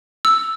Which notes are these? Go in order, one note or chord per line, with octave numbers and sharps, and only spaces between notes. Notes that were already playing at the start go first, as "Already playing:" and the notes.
E6